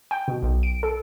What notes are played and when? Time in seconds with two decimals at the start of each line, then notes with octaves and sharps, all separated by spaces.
0.11 G5
0.28 B2
0.43 B1
0.63 D7
0.83 A4